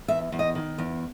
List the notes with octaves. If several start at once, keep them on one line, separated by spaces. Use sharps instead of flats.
E2 E5
E2
D#5
D#3
E2